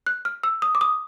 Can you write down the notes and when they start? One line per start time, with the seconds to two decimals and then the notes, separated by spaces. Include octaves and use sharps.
0.07 F#6
0.25 F6
0.43 E6
0.62 D#6
0.75 D6
0.81 D#6